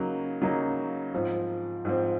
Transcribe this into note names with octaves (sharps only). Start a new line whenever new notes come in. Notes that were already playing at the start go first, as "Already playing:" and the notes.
Already playing: C#3 F#3 A#3 D#4
C#3 F#3 A#3 D#4
G#2 F3 C4
G#2 F3 C4